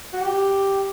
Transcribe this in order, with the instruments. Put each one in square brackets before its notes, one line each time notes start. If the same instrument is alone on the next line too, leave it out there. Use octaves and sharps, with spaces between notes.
[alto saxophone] F#4
G4